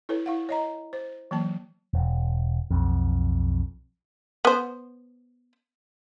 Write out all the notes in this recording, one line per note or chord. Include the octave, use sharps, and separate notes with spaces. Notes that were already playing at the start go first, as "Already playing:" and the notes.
E4 A4 B4 C#5
E4 F5 F#5
C#5 D#5 A#5
C5
E3 F#3 A#3 A5
E1
B1 F2
B3 C5